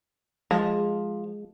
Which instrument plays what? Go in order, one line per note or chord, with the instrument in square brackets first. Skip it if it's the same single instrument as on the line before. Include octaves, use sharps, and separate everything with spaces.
[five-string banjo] F3 [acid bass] G#3